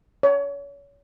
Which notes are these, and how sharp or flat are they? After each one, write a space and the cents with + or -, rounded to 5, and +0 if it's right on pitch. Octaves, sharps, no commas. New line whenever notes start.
C#5 +30